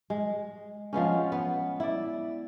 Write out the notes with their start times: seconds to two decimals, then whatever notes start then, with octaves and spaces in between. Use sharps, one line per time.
0.10 G#3
0.93 F3 G#3 B3 C#4
1.32 B3
1.80 E4 D5